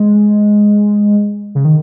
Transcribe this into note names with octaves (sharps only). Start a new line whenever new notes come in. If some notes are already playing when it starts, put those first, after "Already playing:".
Already playing: G#3
C#3
D#3